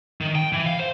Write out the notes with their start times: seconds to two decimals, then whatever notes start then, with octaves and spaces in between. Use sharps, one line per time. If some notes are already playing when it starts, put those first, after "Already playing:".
0.21 D#3
0.35 G5
0.52 E3
0.66 F5
0.79 C5